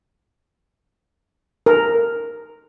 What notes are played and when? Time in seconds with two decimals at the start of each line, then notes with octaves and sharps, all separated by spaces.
1.66 A#4